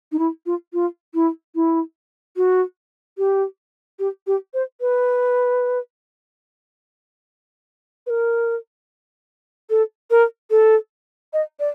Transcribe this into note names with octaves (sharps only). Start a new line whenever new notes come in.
D#4
E4
F4
F4
E4
E4
F#4
G4
G4
G4
C5
B4
B4
A#4
A4
A#4
A4
D#5
D5